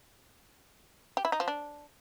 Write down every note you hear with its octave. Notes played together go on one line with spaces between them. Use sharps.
G4
E4
D#4
F3
D4